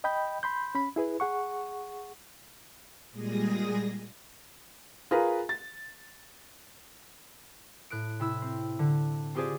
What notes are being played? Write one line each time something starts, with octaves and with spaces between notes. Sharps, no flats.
D#5 G5 B5 G6
B5 C6 G6
C#4 B5
E4 G#4 B4
G#4 F#5 C#6
A#2 G3 G#3 G#4 D#6 A#6
F4 G#4 A#4 B4 A#5
A6
A2 F#6 D7
C3 E4 E6
C4
D3
C4 F4 G4 G#4 C5 D5